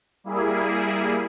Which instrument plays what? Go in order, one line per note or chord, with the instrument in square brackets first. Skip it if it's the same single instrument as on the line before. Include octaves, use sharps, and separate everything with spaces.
[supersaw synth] G3 A#3 E4 G#4